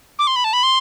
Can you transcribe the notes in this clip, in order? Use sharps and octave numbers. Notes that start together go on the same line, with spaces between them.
D6
C6
B5
A5
B5
C6